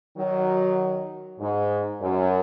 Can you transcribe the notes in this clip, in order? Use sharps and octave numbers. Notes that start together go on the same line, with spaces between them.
D#3 F#3
G#2
F#2